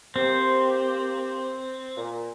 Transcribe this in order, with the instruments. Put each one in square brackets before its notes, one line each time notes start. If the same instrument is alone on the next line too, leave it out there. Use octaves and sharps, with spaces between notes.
[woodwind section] A#3 G4 C5 [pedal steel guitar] C4
[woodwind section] A#2